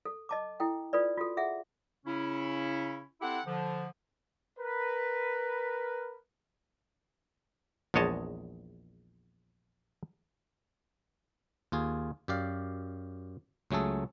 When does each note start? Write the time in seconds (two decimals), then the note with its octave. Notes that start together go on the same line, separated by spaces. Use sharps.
0.05 A4
0.29 D#5 A5 D6
0.60 E4 A4 G5
0.93 F4 A4 B4 D5
1.17 F4 F#4 A4
1.37 G#4 E5 F#5
2.06 C#3 C#4 E4
3.21 C4 E4 G4 A4 F#5
3.46 D3 F3
4.59 A#4 B4
7.94 A#1 E2 G#3 C#5 D#5 A5
11.72 D#2 F4 G#4
12.28 F#2 G4 D5 F5
13.71 C#2 F#3 A3 G#4 A4